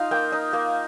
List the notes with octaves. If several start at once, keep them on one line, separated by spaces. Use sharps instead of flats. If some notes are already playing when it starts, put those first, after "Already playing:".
Already playing: D#4 F4 D#5 F5
A#3 G5
D#4
A#3